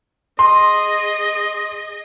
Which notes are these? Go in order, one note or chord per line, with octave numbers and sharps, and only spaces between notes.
G#4 D#5 C6